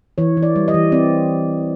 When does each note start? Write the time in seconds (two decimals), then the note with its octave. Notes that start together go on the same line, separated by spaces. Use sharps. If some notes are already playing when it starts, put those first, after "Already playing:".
0.18 E3 C#5
0.37 E3
0.43 D5
0.56 G3
0.68 D#5
0.74 E3
0.92 C4 D5